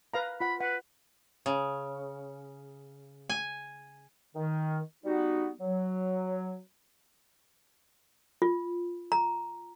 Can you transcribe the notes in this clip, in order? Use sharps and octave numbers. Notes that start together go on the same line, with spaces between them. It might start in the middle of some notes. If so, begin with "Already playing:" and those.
B4 F5 A#5
F4 F#5 B5
B4 F#5
C#3
G#5
D#3
G3 B3 D#4 F#4
F#3
F4
A#5